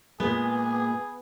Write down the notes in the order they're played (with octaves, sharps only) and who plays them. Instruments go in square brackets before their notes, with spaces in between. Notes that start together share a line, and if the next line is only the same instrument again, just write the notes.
[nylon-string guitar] A#2 G#3 [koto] B3 [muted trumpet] G#4